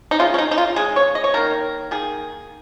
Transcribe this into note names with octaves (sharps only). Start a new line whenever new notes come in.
D#4
C#3 G#3 F4
C#4
D#4
D#4
F4
C#3 G#3 G#4
C#5
D#5
C#5
D#3 A#3 A#4
D#3 A#3 G#4